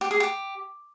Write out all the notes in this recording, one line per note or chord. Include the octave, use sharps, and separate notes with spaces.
G4
G#4
G4